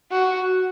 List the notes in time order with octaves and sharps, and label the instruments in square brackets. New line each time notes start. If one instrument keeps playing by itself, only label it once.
[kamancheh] F#4